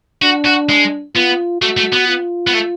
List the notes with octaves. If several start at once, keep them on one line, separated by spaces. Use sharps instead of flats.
D4 F#4
F#4
G#3
B3 F4
A3 F#4
A3
B3
F4
B3
A3